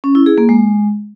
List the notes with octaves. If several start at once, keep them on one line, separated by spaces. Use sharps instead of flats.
C#4
E4
G#4
A#3
G#3